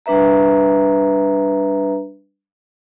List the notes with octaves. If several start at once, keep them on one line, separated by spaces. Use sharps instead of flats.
G3 D4 B4 E5 A#5